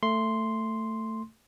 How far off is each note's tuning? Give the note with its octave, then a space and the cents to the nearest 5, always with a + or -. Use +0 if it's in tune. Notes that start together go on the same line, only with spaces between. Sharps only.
A3 +15 C6 +0